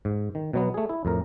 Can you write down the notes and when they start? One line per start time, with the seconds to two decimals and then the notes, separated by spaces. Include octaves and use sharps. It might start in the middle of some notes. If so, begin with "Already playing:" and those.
0.05 G#2
0.35 D#3
0.53 B2 F#3 B3
0.74 A3 G#4
0.89 E4
1.05 F2 A2 A#4